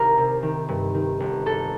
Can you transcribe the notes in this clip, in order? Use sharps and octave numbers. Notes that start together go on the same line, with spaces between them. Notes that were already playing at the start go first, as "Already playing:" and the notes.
Already playing: C2 D#3 G4 A#4
C3
D#3
G2
D#3
G1
G1 A4